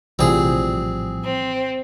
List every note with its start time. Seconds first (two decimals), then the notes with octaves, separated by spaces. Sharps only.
0.19 A#1 A2 C3 E3 F3 G3 C4 G#4
1.24 C4